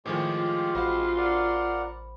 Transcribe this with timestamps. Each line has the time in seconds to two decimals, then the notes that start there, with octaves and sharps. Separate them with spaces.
0.06 A2 D#3 F3 G#3 G4 C5
0.37 F4
0.75 A1 F#4 C5 F5 B5
1.17 A#4 D5 F#5